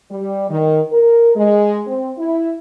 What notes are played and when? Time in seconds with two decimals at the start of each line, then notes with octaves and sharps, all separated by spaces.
0.10 G3
0.50 D#3
0.92 A#4
1.35 G#3
1.86 C4
2.18 E4